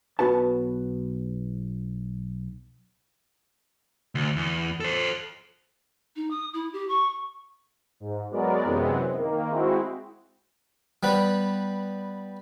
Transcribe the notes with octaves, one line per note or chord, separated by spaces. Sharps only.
B1 F#3 B3 F#4 B4 A5
D2
E2
A4 C5
D#4
D#6
E4
G4
C#6
G#2
F#3 G#3 B3 A#4 D5
F#2 C3 E3 G#3 B3 C4
D#3 A#3
G#3 C4 E4 F#4
G3 B3 B4